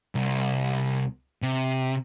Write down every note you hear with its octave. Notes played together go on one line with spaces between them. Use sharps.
C2
C3